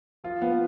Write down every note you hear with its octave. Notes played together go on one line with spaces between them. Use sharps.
F3 F4
F3 B3